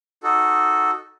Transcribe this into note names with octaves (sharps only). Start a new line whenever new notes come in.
D#4 F#4 A4